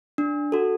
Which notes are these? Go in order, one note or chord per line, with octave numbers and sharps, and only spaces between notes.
D4
F#4 A4